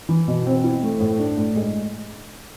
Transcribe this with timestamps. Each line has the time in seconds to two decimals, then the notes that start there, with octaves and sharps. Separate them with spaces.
0.09 E3
0.28 B2
0.46 C4
0.64 E4
0.83 A3
1.00 A2
1.19 D4
1.37 A2
1.56 G#3